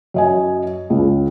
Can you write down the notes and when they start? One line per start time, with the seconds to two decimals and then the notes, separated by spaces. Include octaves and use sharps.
0.14 F#2 D#5 G#5
0.90 C#2